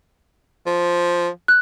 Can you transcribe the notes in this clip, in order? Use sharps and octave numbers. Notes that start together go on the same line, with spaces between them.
F3
F#6